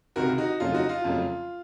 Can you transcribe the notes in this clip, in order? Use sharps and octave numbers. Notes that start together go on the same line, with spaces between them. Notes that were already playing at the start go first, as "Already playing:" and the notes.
C#2 C3 D#3 F#4 A#4
D#4 F#4
F2 C#3 F#3 A3 F4
D#4 F#4
F4
F2 C#3 F#3 A3